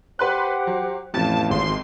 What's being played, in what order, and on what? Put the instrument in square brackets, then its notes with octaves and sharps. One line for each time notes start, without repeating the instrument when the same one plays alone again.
[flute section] G4 C5 F#5 [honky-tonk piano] B4 C6 F#6
[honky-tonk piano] F#3
[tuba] A1 [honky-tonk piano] F2 C3 [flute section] F5 [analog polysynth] A5
[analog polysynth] G#1 C6